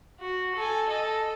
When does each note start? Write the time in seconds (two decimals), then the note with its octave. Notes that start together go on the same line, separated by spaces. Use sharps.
0.20 F#4
0.55 A4 G#5
0.88 A4 D#5